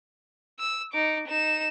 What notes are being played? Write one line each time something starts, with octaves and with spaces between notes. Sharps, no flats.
E6
D#4 D6
D#4 E7